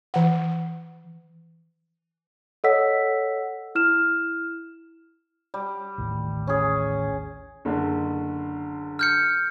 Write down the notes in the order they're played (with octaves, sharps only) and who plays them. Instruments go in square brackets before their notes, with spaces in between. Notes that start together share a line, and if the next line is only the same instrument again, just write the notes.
[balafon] E3 F#5
[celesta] A4 C#5 D#5 F#5 E6 B6
E4 F6 E7
[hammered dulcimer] G3
[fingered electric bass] A1 D#2
[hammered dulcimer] C#4 G#4
[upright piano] F#1 D3
[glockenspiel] F6 G6 C#7